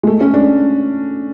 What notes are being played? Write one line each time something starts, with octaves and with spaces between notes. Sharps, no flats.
G#3
A3
C#4
D4